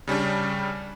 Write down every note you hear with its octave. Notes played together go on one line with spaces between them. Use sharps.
C#3 G3 C#4 D4